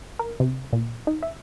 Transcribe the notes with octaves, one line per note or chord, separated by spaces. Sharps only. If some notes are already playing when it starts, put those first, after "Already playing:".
A#4
C3
A#2
D#4
E5